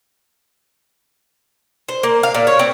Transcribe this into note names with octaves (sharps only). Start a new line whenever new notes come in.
C5
A#3
F5
A#2
C#5
C4